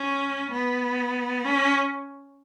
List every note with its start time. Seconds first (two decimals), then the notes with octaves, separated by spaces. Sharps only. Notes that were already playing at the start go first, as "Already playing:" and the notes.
Already playing: C#4
0.52 B3
1.45 C#4